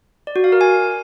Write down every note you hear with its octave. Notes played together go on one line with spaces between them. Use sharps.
D5
F#4
F5
A#4
G#5